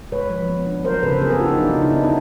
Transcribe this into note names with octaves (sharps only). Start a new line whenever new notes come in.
G#3 B4 C#5
F3
B3
D4
F#3 A#4 C5
C#3 A4 B4
B3 G#4 A#4
A4 B4
D4 F4 G4
D#4
F#3 D4
D#4
C#3
D4 E4
B3 D#4
E4